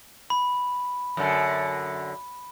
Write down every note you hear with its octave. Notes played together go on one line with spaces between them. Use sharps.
B5
F#2 D3